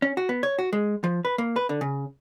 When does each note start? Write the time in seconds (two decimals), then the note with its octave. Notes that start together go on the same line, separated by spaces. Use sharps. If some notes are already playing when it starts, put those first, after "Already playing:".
0.02 C#4
0.17 F#4
0.29 B3
0.43 C#5
0.59 F#4
0.73 G#3
1.04 F3
1.25 B4
1.38 A#3
1.56 B4
1.69 D3
1.81 C#3